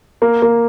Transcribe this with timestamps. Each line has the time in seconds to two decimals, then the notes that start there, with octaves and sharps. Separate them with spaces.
0.22 A#3
0.42 A#3